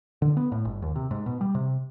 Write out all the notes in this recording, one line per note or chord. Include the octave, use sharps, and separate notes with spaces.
D3
B3
A2
G1
D#2
C3
G#2
B2
G3
C3